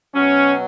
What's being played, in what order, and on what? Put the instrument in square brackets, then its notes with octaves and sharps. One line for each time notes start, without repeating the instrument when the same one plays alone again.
[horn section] B2 F#3 C#4